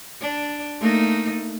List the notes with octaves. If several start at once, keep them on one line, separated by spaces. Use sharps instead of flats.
D4
A3 A#3 D#4